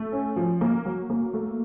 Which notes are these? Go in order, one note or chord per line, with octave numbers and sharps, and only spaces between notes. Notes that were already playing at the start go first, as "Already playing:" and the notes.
Already playing: A3
C#4
F3
A#3
F#3
A#3
A3